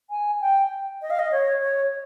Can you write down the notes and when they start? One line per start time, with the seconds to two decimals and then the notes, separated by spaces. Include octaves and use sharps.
0.10 G#5
0.41 G5
1.02 D#5
1.10 F5
1.19 D#5
1.32 C#5
1.61 C#5